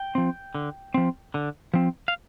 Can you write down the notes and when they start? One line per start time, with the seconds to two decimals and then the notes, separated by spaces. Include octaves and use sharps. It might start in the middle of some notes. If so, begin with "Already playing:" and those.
Already playing: G5
0.15 F3 C4
0.55 D3
0.94 F3 C4
1.34 D3
1.74 F3 C4
2.08 F5